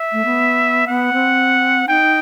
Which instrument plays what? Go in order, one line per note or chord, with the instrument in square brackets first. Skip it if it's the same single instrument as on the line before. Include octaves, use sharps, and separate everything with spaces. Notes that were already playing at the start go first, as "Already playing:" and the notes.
Already playing: [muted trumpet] E5
[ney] A3
B3
[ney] B3 [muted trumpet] F#5
[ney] C4
[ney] D#4 [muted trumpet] G5